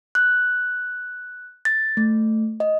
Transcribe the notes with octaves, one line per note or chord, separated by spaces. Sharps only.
F#6
A6
A3
D#5